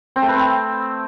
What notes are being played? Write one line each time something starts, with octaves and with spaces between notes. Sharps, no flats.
C4
A3
B4
C4